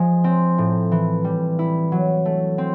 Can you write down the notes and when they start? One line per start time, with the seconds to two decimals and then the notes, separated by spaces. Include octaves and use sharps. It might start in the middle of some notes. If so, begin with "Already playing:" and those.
Already playing: F3 G#3
0.24 C4
0.58 A2
0.92 E3
1.24 G3
1.59 E4
1.92 F#3
2.25 A3
2.58 C4